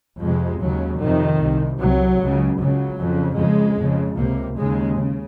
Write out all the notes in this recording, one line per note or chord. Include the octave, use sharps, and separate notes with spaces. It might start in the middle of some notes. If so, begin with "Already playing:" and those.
F2 C3 G#3
D#2 C#3 F#3
F2 C3 D#3
C2 C3
C2 C3 F#3
C#2 C#3
C#2 C#3 F#3
F2 C#3
F2 C#3 G#3
F2 C#3
C#2 C3 A#3
D#2 C#3 G#3
C#3